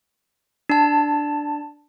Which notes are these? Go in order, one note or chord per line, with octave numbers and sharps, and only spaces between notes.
D4 A5